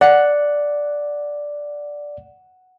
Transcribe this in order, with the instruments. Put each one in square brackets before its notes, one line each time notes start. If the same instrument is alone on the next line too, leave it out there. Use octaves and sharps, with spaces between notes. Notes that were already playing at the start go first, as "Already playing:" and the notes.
[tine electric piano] D5 [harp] F#5